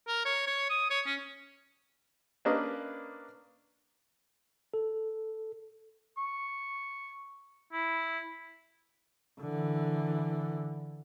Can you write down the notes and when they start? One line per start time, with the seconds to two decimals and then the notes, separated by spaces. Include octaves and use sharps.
0.08 A#4
0.25 C#5
0.47 C#5
0.70 D#6
0.90 C#5
1.06 C#4
2.45 A#3 C#4 D4 B4 D#5
4.74 A4
6.18 C#6
7.73 E4
9.41 D3 E3